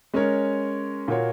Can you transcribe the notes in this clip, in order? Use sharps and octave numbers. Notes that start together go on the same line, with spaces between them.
G#3 C#4 A#4 C#5
A#2 A#3 F#4 C#5